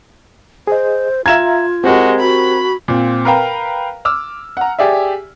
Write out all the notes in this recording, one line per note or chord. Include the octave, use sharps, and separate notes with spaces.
G#4 C5 D#5
F4 E5 F5 A#5 G#6 E7
G#3 C4 F#4 G4 A#4
F#4 B5
A#2 C4
A#4 B4 F5 G5 A#5
D6 E6 F6
F#5 A#5
G4 G#4 D5 E5